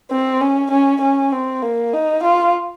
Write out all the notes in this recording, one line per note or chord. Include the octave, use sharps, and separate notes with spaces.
C4
C#4
C#4
C#4
C4
A#3
D#4
F4